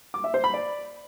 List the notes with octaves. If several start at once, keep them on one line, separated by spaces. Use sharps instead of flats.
D6
E5
C5
B5
D5